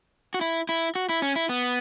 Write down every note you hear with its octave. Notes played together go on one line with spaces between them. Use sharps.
F#4
E4
E4
F#4
E4
C#4
E4
B3